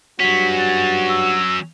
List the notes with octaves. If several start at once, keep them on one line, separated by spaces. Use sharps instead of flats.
G2 F#3 G3 C#4 F#4 B6
A6
E6